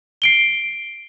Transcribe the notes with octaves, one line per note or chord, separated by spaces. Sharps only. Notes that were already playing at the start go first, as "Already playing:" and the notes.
C7 D7 G7